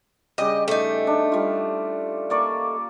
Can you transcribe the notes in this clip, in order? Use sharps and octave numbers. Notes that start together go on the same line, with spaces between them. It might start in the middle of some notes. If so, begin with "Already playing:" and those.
C#3 G3 G4 D#5
A3 D#4
D4
G3 F4
A#3 D5 C#6